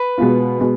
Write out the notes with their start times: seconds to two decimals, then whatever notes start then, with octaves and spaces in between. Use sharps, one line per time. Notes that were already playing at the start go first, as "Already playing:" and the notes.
Already playing: B4
0.18 B2 G#3 B3 F4
0.59 B2 G#3 B3